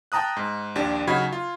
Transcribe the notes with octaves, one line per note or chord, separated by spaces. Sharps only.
G5 A5 A#5 D#6 F#6
G#2
A#1 D#2 D4 G4
C#3 F#3 D#4 F#4 B5 G#6
F4